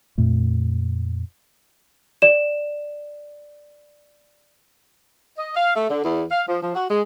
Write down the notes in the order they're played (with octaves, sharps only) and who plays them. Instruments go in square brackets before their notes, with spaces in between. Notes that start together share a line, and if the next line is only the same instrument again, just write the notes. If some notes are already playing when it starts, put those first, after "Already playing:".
[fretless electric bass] F2 A#2 A3
[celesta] D5 E7
[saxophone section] D#5
F5
A3
D3
E2
F5
F3
F3
F#4
G#3